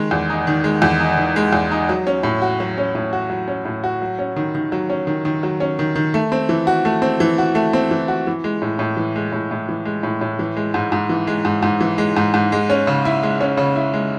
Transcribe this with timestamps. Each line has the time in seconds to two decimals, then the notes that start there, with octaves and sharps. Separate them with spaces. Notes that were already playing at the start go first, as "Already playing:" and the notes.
Already playing: D#3 G#3
0.11 E2
0.30 D#4
0.47 D#3
0.64 G#3
0.82 E2
1.01 D#4
1.17 D#3
1.36 G#3
1.53 E2
1.71 D#4
1.89 F#3
2.07 C#4
2.23 A2
2.42 F#4
2.60 F#3
2.78 C#4
2.95 A2
3.13 F#4
3.30 F#3
3.48 C#4
3.65 A2
3.84 F#4
4.02 F#3
4.19 C#4
4.36 D#3
4.55 D#3
4.72 F#3
4.90 C#4
5.07 D#3
5.25 D#3
5.43 F#3
5.60 C#4
5.79 D#3
5.96 D#3
6.14 A3
6.32 C4
6.49 E3
6.67 F#4
6.85 A3
7.02 C4
7.20 E3
7.38 F#4
7.55 A3
7.73 C4
7.91 E3
8.08 F#4
8.27 E3
8.44 G#3
8.62 A2
8.79 A2
8.97 E3
9.16 G#3
9.32 A2
9.51 A2
9.69 E3
9.85 G#3
10.03 A2
10.21 A2
10.39 E3
10.56 G#3
10.74 G#2
10.92 G#2
11.09 E3
11.27 G#3
11.45 G#2
11.63 G#2
11.81 E3
11.98 G#3
12.17 G#2
12.34 G#2
12.52 G#3
12.70 C#4
12.87 C#3
13.05 E4
13.23 G#3
13.41 C#4
13.58 C#3
13.76 E4
13.93 G#3